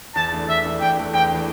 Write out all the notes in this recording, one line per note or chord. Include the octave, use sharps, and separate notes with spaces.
E2 A5
E3 A3 D4
E2 E5
E3 A3 D4
E2 G5
E3 A3 D4
E2 G5
E3 A3 D4